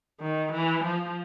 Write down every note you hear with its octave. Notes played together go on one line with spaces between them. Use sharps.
D#3
E3
F3